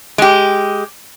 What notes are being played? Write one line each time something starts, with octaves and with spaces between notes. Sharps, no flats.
G#3 G4